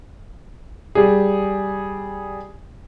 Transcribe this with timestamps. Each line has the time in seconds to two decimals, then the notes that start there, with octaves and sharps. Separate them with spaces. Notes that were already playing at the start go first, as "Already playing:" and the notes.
0.95 G3 G#4